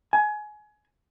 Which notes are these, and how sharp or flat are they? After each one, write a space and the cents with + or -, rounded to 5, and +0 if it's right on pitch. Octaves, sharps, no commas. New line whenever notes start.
G#5 +25